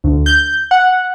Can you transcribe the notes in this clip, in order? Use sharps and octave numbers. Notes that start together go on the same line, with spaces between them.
D2
G6
F#5